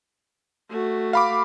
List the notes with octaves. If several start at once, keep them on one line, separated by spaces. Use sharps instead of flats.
A3 F#4
F5 B5 D6